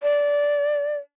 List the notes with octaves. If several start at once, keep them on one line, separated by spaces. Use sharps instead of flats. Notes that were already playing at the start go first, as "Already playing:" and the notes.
D5